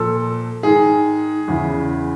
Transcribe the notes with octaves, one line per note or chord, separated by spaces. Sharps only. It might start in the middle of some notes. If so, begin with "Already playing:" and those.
Already playing: A#2 F3 A4
G#2 D#3 G#4
E2 C#3 E3